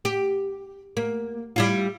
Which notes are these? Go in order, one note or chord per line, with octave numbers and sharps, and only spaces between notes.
G4
A#3
G3 E4 F4